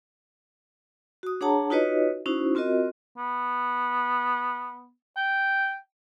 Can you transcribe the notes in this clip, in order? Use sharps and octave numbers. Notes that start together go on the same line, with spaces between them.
F#4 D#6
D4 G#4 C#5 F#5 A5 A#5
D#4 F4 F#4 B4 C#5 D#5
C#4 D#4 E4 F#4 C5
C4 F4 F#4 A#4 D#5
B3
G5